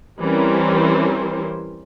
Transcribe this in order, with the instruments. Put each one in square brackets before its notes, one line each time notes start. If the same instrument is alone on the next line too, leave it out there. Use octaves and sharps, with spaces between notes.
[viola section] E3 G3 C4 C#4 A#4 C5